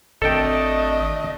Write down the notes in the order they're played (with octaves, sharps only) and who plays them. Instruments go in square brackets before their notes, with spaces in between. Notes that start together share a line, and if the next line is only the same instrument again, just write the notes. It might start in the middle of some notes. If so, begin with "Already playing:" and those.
[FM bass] G#1 [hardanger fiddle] A3 D4 [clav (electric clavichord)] A4 G5 [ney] D#5